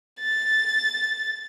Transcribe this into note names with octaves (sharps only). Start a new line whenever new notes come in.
A6